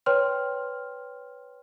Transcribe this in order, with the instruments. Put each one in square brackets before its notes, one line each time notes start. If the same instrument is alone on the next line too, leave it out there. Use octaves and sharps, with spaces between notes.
[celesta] B4 C#5 G5 C6 F6